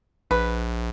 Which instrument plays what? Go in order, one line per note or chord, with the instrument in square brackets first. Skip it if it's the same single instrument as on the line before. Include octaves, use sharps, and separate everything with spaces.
[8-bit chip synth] A#1 [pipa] B4